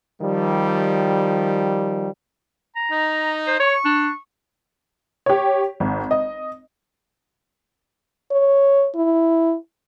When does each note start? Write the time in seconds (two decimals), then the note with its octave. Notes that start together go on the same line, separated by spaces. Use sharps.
0.21 D#3 F3 G3
2.76 A#5
2.91 D#4
3.47 C5
3.59 C#5 C#6
3.85 D4
5.26 G4 C#5
5.80 G#1
6.11 D#5
8.31 C#5
8.96 E4